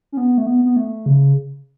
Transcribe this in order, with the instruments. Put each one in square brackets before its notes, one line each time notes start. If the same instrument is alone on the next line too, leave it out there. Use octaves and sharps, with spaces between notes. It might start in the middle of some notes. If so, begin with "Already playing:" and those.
[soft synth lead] C#4
B3
A3
B3
B3
A3
C#3